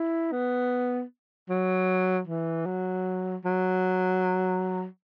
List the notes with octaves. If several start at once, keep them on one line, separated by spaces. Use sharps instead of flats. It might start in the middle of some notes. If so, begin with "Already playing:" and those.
Already playing: E4
B3
F#3
E3
F#3
F#3